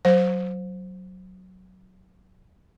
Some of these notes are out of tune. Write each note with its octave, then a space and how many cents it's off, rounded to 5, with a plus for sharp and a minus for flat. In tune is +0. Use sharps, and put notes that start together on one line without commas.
F#3 +0 C5 +0